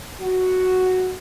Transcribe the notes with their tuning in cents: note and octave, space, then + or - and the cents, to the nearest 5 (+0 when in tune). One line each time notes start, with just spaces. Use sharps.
F#4 +0